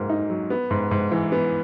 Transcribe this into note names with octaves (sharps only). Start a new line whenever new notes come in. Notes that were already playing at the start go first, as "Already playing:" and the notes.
Already playing: G#2 F#3 A#3
D#4
F#3
B3
G#2
G#2
E3
B3